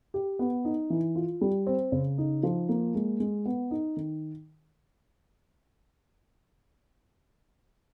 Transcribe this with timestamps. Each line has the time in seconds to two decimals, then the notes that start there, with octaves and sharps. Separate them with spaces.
0.14 G4
0.39 B3
0.65 D#4
0.90 E3
1.16 F4
1.41 G3
1.67 C4
1.92 C#3
2.18 D#4
2.43 F3
2.69 A#3
2.95 G#3
3.20 G#3
3.46 B3
3.71 D#4
3.97 D#3